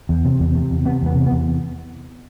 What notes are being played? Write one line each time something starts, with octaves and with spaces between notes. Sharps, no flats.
E2
C3
E2
C3
E2
C3 B3
E2 B3
C3
B3
E2